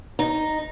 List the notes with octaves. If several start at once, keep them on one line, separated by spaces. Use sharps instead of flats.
D#4